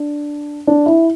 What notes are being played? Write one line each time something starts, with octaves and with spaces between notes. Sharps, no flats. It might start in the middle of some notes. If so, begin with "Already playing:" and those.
Already playing: D4
D4
E4